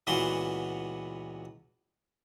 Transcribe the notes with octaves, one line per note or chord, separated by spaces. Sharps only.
C#2 A#2 E3 B3 F#4 C6